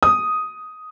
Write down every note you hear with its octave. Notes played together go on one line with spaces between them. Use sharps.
D#6